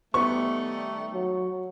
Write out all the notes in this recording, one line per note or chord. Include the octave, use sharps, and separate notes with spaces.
D#3 G3 A3 B3 C#6
F#3